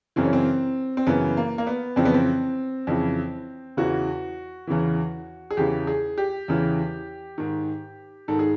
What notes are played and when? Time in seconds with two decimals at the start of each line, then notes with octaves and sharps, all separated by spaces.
0.16 F#2 C#3 E3 C4
0.25 C#4
0.33 C4
0.97 C4
1.07 F#2 C#3 E3 B3
1.37 A#3
1.58 A#3
1.67 B3
1.96 F2 C#3 E3 C4
2.05 B3
2.14 C4
2.87 F2 C#3 E3
3.77 E2 C#3 E3 F#4
4.67 E2 C#3 E3
5.50 G#4
5.57 E2 C#3 E3 G4
5.87 G#4
6.18 G4
6.48 E2 C#3 E3
7.38 G#2 D#3
8.28 G#2 D#3 A4
8.39 G#4